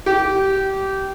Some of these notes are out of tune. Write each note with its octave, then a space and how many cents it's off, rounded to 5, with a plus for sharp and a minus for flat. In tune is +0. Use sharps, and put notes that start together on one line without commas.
G4 -20